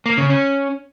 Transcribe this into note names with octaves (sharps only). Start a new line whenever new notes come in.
A#3
C#3
C#4